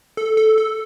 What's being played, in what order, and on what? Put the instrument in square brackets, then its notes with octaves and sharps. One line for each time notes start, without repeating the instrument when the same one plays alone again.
[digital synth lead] A4
A4
A4